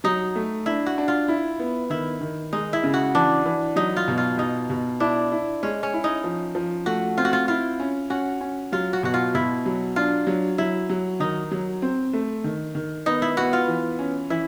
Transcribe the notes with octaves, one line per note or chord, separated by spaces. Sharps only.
F#3 D#4
A3
D4 E4
F#4
D4
F4
E4
B3
D#3 E4
D#3
G#3 D#4
E4
C#3
F#4
E3 D4
E3
F#3 D#4
F4
B2
F4
B2 D#4
B2
D4 E4
E4
G#3 C#4
C#4
E4
D#4
F3
F3
A3 F#4
C4 F4
F#4
F4
E4 F4
C#4
C#4 F#4
C#4
F#3 F4
F#4
B2 F#4
F4
B2 E4
F#3
D4 F4
F#3
F#3 E4
F#3
D#3 D#4
F#3
C4
A3
D#3
D#3
B3 D#4
E4
B3 F#4
F4
E3
C#4
E3 E4